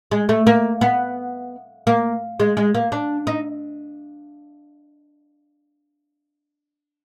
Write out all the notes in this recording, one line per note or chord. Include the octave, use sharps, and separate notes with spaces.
G#3
A3
A#3
B3
A#3
G#3
G#3
A#3
D4
D#4